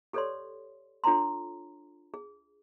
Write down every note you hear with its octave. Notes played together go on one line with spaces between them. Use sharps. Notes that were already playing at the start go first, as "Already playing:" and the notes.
G4 A4 B4 C#5 D5 C6
D4 F4 A4 C#5 A#5 C6
G#4